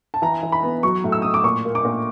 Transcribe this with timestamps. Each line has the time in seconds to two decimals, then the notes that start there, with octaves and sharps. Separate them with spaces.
0.14 A5
0.22 E3 A#5
0.43 E3
0.52 B5
0.63 B3
0.83 F#3 C#6
1.04 A2
1.12 E6
1.22 A2 D#6
1.34 D6
1.44 A#2 C#6
1.65 A#3
1.75 D6
1.85 A#2